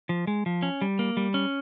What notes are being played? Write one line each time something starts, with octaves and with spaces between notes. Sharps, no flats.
F3
G#3
F3
C#4
G3
A#3
G3
C#4